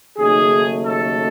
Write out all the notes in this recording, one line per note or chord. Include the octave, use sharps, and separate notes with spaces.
D#2 C#3 F#3 A3 D#4 G#4
A4